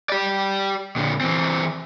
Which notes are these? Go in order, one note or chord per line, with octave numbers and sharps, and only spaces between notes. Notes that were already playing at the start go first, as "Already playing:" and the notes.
G4 D5
A#2 D3
E3 C4